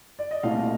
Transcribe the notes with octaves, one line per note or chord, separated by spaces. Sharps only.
D5
D#5
C2 A#2 A3 C4 F5